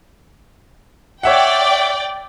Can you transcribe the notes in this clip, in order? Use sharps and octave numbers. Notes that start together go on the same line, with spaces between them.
C#5 D5 E5 F#5 G5